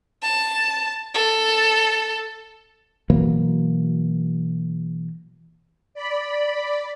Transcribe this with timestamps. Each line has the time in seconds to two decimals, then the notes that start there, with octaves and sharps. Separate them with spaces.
0.23 A5
1.14 A4
3.10 B2 E3 F#3 A#3
5.94 D5 B5